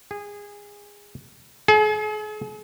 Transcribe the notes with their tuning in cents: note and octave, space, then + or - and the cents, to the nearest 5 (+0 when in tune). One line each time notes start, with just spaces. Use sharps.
G#4 -20
G#4 +40